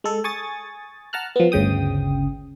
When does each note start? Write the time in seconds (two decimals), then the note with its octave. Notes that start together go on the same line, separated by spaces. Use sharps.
0.04 G#3 A4
0.24 G#5 C#6 D#6 A6
1.13 F#5 A5 A#5 F6 F#6
1.36 F3 B3
1.52 G1 D2 C#3 G5 D#6